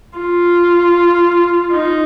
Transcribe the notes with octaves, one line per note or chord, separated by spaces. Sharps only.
F4
D#4